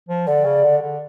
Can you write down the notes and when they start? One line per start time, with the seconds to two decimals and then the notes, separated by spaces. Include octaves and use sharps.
0.09 F3
0.27 D3 D5
0.44 C#3
0.63 D3
0.81 D3